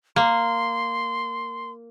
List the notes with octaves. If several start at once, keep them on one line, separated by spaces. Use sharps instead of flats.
A#3 C6